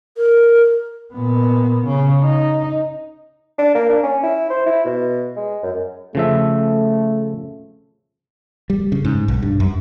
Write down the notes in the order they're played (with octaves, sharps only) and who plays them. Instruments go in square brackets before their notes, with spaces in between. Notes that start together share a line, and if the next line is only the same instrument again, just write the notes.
[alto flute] A#4
[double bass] A#2 B3
C#3
D#4
[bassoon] D4
A#3
D4
C#4
E4
C5
E4
B2
G#3
F#2
[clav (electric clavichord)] C#3 F3 E5 [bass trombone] A3
[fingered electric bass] G3
C#3
G#2
B1
G2
F#2